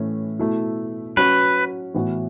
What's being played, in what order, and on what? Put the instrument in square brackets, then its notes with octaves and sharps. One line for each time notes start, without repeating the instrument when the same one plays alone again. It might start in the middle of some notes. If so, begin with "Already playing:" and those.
Already playing: [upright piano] A2 E3 A3 C#4 E4
B2 A3 E4
[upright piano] F#3 C#4 F#4 [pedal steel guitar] B4
[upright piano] A2 E3 B3 F#4